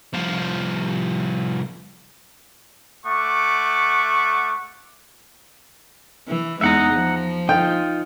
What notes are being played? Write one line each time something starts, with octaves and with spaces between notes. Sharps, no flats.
C2 F3
A3 F#5 C#6 D6
E3
E2 G#3 D#4 E5 F#5 A#5
F3
D#4 F4 G5